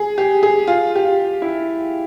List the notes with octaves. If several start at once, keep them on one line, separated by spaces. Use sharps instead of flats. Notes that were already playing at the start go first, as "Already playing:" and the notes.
Already playing: G#4
G4
G#4
F4
G4
F4
E4